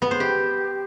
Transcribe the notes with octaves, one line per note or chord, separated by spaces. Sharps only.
B3
C5
G4